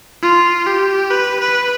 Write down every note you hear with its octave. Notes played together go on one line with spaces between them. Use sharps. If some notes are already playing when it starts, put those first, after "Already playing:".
F4
G4
B4
B4